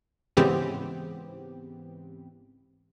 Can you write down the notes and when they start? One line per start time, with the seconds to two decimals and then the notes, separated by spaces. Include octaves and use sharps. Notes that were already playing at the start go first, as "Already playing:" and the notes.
0.37 G#2 C#3 E3 B3 C4 G4